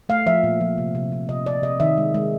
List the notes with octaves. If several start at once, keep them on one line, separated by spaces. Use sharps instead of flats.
A3 F5
F3 E5
A#2
F3
C3
C3
C3
C3 D#5
C3 D5
C3 D#5
D#3 E5
G#3
G#3